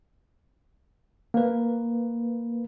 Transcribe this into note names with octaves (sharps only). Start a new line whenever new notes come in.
A#3 B4